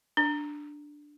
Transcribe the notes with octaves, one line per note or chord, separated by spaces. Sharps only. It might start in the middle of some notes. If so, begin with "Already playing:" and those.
D4